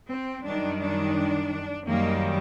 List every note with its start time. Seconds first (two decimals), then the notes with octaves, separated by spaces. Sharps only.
0.10 C4
0.45 F#2 D#3 G3 D4
0.80 D4
1.88 F#2 D#3 G3 A#3